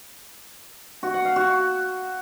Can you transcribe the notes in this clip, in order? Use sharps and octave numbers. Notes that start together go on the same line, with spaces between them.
F#4
F#5
F5
F#4